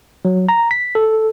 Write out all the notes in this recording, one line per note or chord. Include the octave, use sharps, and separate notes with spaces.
F#3
A#5
B6
A4